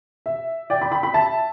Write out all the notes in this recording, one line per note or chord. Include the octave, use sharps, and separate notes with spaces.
E5
D5 G5
G5 B5
G5 B5
G5 B5
E5 A5